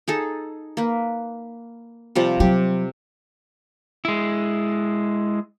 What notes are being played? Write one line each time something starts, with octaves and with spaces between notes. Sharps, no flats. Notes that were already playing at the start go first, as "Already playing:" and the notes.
D#4 G#4 A4
A#3 B4
C3 F3 G3
C3 F#3 G4
G#3 E4